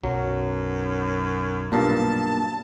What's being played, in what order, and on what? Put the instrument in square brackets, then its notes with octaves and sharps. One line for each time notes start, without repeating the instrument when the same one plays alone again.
[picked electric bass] B1 [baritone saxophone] F#2 [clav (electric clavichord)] F#3
[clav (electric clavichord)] B1 G2 A#2 [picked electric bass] A#3 [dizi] A5